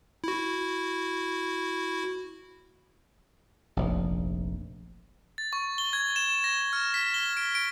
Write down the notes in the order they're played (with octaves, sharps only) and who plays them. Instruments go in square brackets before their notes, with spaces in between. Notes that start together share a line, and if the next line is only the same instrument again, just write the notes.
[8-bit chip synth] E4 F#4
[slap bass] F1 A#1
[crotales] A6
C#6
G7
G#6
E7
A#6
F6
B6
G7
D7
D7